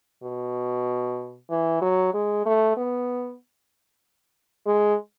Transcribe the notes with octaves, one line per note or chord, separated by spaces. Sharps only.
B2
E3
F#3
G#3
A3
B3
G#3